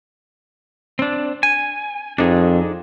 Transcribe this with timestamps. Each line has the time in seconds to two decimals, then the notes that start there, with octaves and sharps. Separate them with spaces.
0.99 C4 D4
1.43 G#5
2.18 F2 D4 D#4 G#4